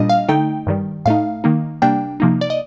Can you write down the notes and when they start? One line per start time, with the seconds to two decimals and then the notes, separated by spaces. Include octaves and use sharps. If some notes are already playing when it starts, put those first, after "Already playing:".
Already playing: A#2 G3 A#3 D4 D#5
0.09 F5
0.29 D3 A3 D#4 G5
0.67 G2 D#3 G3
1.05 A2 A3 D#4 F5
1.44 D#3 A#3 D#4
1.82 C3 G3 A#3 D4 G5
2.20 C3 F3 A#3 D#4
2.41 D5
2.50 D#5